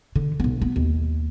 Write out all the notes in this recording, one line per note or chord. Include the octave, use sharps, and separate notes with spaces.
D3
B1 B3
B3
D#2